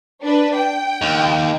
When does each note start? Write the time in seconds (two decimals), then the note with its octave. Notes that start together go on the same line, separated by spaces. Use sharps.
0.23 D4 B4
0.56 G5
1.02 D#2